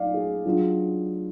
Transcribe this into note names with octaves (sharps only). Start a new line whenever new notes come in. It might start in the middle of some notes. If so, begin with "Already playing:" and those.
Already playing: F#3 D#4 D5 F5
G#4
F#3 D4 F4 G#4